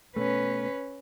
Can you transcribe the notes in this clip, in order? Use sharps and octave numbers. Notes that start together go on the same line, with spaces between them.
B2 A3 C#4 B4